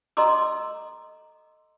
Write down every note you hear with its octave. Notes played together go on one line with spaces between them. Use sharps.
A4 D#5 A#5 C6 D6 E6